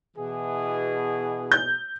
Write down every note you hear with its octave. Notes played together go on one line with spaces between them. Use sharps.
B2 E3 G#4
G6